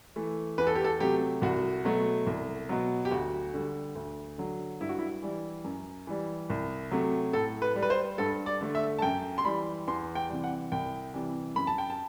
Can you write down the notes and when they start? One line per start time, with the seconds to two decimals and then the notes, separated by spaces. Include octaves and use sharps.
0.16 E3 A3
0.58 E2 B4
0.67 A4
0.75 G4
0.84 A4
1.00 C3 F#3 A3 G4
1.42 C2 F#4
1.85 B2 F#3 A3
2.27 C2
2.69 B2 F#3
3.05 G4
3.11 D2 F#4
3.54 D3 G3
3.95 D2
4.38 D3 F#3
4.81 G2 E4
4.89 F#4
4.99 E4
5.22 E3 G3
5.64 F#2
6.07 E3 G3
6.50 C2
6.91 C3 F#3 A3
7.33 A2 A4
7.62 B4
7.76 G3
7.83 B4
7.90 C5
8.18 G2 A4
8.46 D5
8.61 D3 A3
8.75 E5
8.99 A5
9.02 F#2 G5
9.38 C6
9.45 E3 G3 B5
9.87 E2 C6
10.15 G5
10.29 C3 E3 G3
10.44 F#5
10.72 C2 G5
11.14 C3 E3 G3
11.56 F#2 B5
11.67 A5
11.78 G5
11.90 A5